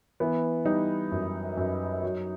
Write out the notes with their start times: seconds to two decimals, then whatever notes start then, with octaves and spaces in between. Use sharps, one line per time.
0.20 E3 B3
0.65 G3 D#4
1.12 F#2
1.57 F#2
2.03 F#3